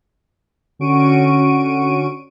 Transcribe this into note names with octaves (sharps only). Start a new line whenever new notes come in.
D3 C#4 F#4 C#6 D7 D#7